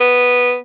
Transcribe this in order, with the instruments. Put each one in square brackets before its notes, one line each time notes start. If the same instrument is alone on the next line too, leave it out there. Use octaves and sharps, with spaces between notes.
[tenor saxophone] B3